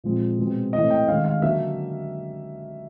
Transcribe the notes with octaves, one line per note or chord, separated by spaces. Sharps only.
A#2 F3 G#3 C4
B2 G#3 C4
A2 E3 A3 C4 D#5
G5
D#3 G#3 C#4 F5
F5
D3 F#3 A#3 C#4 E5